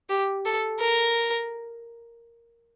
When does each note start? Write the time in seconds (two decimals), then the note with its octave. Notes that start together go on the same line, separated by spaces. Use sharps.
0.09 G4
0.45 A4
0.80 A#4